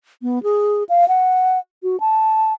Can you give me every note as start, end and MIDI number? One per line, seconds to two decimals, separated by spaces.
0.22 0.43 59
0.43 0.84 68
0.89 1.08 77
1.08 1.59 78
1.83 1.99 66
2.00 2.54 81